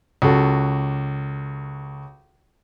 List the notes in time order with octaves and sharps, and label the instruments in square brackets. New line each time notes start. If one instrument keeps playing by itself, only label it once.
[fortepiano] C#2 F#4 A4